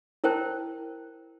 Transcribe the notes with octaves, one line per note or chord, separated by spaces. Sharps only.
E4 A#4 C5 G5 A5